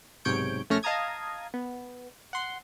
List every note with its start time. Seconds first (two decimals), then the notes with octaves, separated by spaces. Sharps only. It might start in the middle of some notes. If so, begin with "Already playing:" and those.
0.25 B1 G#2 C3 C#5 G6 D7
0.70 A#1 A3 C#4 C#5 F6 A#6
0.83 D#5 F5 A5 A#5 D#6 G#6
1.54 B3
2.33 F#5 C6